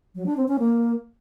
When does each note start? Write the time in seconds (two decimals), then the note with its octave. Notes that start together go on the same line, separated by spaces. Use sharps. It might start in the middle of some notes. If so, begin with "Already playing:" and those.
0.15 F#3
0.26 D4
0.37 C4
0.48 C#4
0.59 A#3